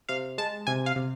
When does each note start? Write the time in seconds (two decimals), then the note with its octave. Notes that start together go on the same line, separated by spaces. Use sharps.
0.09 C3 F5
0.38 G#3 A5
0.67 C3 G#5
0.86 F5
0.96 C3